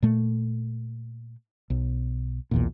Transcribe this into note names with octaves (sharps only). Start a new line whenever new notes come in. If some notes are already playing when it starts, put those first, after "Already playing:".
A#2 A3
B1
B1 E2 A#2